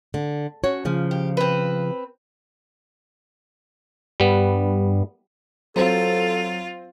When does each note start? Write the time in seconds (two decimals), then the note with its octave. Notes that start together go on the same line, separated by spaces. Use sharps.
0.14 D3
0.64 C#4 F#4 C#5
0.85 C#3 F3
1.11 G4
1.37 C4 B4
4.20 G2 G3 B3
5.76 F#3 C4 F4 A4